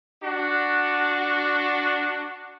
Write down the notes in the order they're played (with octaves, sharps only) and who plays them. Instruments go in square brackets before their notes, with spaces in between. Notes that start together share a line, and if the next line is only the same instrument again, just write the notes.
[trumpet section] D4 F#4